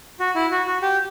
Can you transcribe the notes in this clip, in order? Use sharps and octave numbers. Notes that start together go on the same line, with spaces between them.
F#4
E4
F#4
F#4
G4